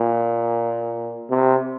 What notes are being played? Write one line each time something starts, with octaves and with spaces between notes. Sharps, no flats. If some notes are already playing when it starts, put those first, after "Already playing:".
Already playing: A#2
C3